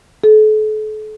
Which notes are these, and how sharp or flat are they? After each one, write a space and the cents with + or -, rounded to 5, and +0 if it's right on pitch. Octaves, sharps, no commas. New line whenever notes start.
A4 -40